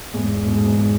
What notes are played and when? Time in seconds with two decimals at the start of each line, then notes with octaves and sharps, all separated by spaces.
0.14 E2 G#2
0.45 G#2 B2
0.55 G#2 B2
0.65 E2